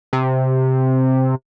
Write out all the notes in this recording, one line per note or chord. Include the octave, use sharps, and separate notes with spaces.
C3